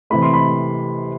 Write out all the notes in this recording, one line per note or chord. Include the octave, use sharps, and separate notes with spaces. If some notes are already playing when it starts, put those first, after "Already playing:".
C3 E3 A3 B5
C6
B5